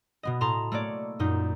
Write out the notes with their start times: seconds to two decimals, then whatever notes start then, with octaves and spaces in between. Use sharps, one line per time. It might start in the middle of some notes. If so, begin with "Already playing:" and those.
0.23 B2 B3 D#5
0.41 A2 A5 A#5 C6
0.72 A3 A#3 C#5 D5
1.19 F#2 A#2 D#4